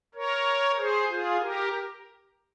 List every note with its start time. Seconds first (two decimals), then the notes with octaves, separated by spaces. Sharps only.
0.15 A#4 C#5
0.78 G#4 C5
1.09 F4 G#4
1.41 G4 A#4